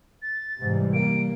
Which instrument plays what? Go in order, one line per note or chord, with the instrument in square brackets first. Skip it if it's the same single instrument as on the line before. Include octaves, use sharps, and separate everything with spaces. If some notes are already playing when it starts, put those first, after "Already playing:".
[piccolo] A6
[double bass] G#2 [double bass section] C3 E3 G3
[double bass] A#3 [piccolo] D7